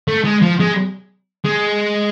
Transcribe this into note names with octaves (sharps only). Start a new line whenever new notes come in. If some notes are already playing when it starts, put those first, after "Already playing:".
A3
G#3
F3
G#3
G#3